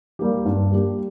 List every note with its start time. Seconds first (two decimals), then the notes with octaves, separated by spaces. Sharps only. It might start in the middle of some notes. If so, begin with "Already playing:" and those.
0.19 G3 A#3 G4
0.45 G2
0.71 G3 A#3 G4